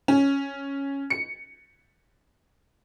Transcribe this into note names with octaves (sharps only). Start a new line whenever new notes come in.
C#4
C#7